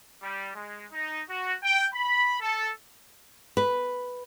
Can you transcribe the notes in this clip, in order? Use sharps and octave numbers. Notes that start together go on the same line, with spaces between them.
G3
G#3
D#4
F#4
G5
B5
A4
B4